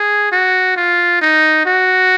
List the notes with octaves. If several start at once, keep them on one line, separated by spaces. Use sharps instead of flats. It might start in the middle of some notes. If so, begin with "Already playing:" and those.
Already playing: G#4
F#4
F4
D#4
F#4